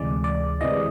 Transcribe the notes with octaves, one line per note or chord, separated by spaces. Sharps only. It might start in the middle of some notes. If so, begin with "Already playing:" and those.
Already playing: D2 C3 E3 G#3 D5
D5
D2 C3 E3 G#3 D#5